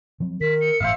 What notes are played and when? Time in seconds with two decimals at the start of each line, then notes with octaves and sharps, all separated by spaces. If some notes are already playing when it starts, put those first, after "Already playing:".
0.20 F3 F#3 C4
0.41 D#3 A#4 B6
0.61 C#7
0.80 G1 A2 E3 C5 E5 F5